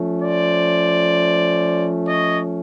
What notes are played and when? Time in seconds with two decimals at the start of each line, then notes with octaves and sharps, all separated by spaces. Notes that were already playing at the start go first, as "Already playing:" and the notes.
Already playing: F3 A3 C#4
0.23 C5 D5
2.07 C#5 D#5